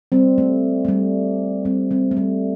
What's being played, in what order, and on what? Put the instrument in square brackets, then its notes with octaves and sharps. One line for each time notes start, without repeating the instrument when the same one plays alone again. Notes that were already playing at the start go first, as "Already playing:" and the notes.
[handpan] G3 C4
A3
A3
G3
G3 C4
G3 C4
A3
G3 C4